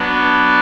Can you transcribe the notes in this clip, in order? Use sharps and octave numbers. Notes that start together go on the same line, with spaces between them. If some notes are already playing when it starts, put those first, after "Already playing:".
Already playing: F#3 B3 D4